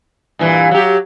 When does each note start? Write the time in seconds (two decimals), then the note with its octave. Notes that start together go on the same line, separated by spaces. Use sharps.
0.39 G2 A#2 E3
0.71 F#3 G4